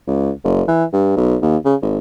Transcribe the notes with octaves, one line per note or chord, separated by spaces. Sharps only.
C#2
F#1
E3
G2
B1
D#2
C#3
G#1